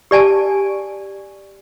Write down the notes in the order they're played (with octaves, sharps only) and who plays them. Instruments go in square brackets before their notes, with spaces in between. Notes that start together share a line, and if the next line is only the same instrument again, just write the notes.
[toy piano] G4 D5 G#5 A5